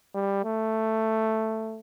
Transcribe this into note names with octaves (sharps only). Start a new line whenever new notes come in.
G3
A3